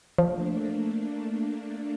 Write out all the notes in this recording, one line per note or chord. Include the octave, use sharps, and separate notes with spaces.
F3 A3 A#3 D4